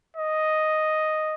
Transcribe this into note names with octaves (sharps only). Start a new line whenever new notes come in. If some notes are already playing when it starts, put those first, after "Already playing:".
D#5